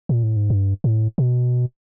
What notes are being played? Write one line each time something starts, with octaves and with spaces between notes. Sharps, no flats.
A#2
A2
G#2
G2
A2
B2